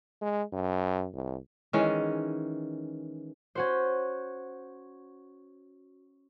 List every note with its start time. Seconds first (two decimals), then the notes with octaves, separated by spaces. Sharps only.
0.22 G#3
0.53 F#2
1.14 C2
1.73 D#3 E3 G#3 C#4
3.55 C#4 F#4 C5